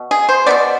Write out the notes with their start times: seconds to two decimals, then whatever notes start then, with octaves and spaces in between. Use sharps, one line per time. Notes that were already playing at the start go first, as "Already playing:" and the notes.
Already playing: B2
0.11 G#4
0.29 C5
0.46 B2 G#3 B3 D5